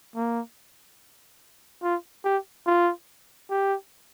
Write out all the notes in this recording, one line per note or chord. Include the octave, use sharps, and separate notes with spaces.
A#3
F4
G4
F4
G4